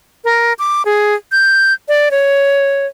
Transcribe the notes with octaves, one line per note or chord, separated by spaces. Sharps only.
A#4
D6
G#4
G6
D5
C#5